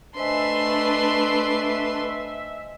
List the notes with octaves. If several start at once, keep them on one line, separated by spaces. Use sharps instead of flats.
A3 D4 B4 C5 D#5 E5 G#5 C6